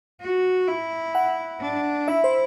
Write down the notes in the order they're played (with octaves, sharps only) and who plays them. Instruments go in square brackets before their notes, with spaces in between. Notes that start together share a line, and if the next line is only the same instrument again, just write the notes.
[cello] F#4
E4
[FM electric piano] F#5
[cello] D4
[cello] E4 [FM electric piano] E5
[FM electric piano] C5